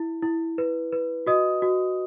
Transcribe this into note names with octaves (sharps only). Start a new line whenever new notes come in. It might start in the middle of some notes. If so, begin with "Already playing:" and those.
Already playing: E4
E4
B4
B4
F#4 D#5 D#6
F#4